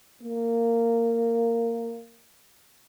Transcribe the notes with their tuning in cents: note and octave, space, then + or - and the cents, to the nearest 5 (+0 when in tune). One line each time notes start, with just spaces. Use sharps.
A#3 -15